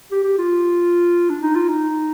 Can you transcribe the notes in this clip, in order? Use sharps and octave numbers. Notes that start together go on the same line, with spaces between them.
G4
G4
F4
D4
D#4
F4
D#4